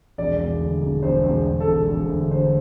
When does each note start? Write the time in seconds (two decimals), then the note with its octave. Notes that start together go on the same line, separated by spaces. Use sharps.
0.18 E1 D5
0.39 E1
0.61 D2
0.81 E1
1.03 E1 C5
1.24 E1
1.46 E1
1.60 A4
1.67 E1
1.88 E1 A4
2.09 D2
2.31 D2 C5